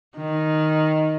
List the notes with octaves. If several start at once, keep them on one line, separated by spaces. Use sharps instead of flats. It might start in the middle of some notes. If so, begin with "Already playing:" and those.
D#3